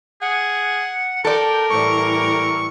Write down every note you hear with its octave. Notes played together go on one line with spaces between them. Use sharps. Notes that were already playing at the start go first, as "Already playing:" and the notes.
G#4 F#5
A4 A#4 D5 G5
A2 E3 G3 C#6